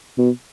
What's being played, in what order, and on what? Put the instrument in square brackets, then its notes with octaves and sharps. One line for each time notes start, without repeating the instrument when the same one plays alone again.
[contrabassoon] B2